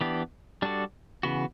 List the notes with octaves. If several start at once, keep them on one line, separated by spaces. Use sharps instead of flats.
E3 B3 D4 G4
G3 D4 F#4 A4 D5
C#3 E3 B3 F#4